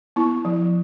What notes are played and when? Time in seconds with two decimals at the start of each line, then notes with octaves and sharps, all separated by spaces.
0.16 B3 E4
0.45 F3